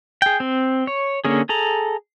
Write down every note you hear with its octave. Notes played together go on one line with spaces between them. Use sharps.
G#4 G5
C4
C#5
D3 A#3 C#4 G#4
G#4 A4 A#5